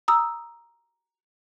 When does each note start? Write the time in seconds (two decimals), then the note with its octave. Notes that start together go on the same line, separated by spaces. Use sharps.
0.08 A#5 D#6 E6